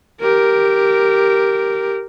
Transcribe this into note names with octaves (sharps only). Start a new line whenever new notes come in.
G4 A#4